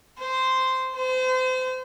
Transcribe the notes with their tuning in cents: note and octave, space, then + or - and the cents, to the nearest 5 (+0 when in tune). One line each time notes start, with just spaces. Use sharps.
C5 -10
C5 -35